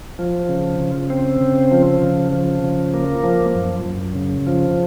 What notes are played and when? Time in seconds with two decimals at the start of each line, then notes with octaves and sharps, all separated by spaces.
0.19 F3
0.49 C#3
0.80 C#3
1.10 C4
1.41 C#3
1.72 F3
2.02 C#3
2.32 F3
2.63 C#3
2.94 A#3
3.24 F3
3.55 F#2
3.85 F#2
4.15 C#3
4.47 F3